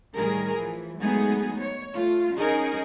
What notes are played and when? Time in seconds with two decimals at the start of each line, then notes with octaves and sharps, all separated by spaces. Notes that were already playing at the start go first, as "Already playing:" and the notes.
0.16 A2 D#3 G3 G#4 A#4
0.55 E3 F3
0.99 F#3 G#3 A3 B3 D#4 G#4
1.60 C#5
1.93 A3 F4
2.34 C#4 D#4 G#4 A#4